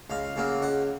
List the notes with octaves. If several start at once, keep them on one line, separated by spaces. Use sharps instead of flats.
C#2 F5
C#3 F#3 A#3
C#2 F#5